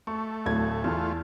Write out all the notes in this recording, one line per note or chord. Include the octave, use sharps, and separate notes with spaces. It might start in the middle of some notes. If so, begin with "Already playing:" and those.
A3 C#6
D1 G#6
E2 A3 F4